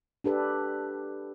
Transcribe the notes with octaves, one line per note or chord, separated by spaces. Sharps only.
D4 G4 A4 B4